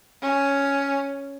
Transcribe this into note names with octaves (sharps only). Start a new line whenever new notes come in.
C#4